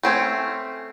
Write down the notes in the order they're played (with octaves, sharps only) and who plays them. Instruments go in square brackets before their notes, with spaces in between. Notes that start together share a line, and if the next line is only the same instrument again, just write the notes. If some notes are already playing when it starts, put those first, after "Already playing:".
[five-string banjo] A3 C4 C#4